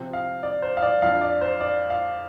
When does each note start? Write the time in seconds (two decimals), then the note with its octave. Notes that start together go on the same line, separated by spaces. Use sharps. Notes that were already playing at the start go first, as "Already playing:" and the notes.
Already playing: C3 F3 C4
0.13 F5
0.43 D5
0.62 C5
0.77 F5
0.82 D5
1.02 F2 F3 D4 F5
1.21 D5
1.41 C5
1.61 D5
1.90 F5